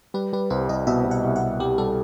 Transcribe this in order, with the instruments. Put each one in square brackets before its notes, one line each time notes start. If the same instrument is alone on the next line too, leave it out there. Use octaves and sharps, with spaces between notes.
[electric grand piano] G3 [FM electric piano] B4
[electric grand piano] G3 [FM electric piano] B4
[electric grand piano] C2 [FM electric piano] C5
[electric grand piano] C2 [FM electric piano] D#5
[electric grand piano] B2 [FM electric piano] E5
[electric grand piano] B2
[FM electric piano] F#5
[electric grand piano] C2
[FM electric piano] F#5
[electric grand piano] C2
[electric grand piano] C2 [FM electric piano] G4
[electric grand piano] G3 [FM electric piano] A4